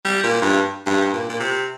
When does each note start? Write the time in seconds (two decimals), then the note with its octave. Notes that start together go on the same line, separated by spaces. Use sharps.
0.05 G3
0.23 A#2
0.42 G2
0.86 G2
1.13 A#2
1.29 A#2
1.40 C3